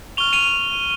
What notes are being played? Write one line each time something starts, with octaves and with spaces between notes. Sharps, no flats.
C#6 F6 F7 G7
D#7 F7